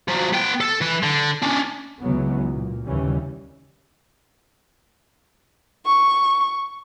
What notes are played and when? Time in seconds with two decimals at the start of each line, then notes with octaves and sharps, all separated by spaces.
0.08 F3 F#3
0.33 B3 G5
0.61 A4
0.81 E3 B4
1.03 D3
1.43 C#4 D4
2.02 C#2 C#3 E3 F#3 B3
2.53 A#2
2.86 D#2 C#3 E3 G3 C#4
5.86 C#6